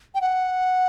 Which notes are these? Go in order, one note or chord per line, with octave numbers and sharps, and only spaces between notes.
G5
F#5